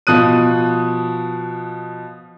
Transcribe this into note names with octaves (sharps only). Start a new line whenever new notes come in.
B2 F3 D#6 F#6 D#7